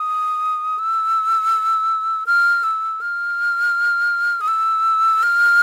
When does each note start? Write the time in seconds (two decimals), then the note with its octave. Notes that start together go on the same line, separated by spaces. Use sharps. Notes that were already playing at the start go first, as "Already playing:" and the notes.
Already playing: D#6
0.79 E6
2.26 F6
2.63 E6
3.01 F6
4.41 D#6
4.48 E6
5.23 F6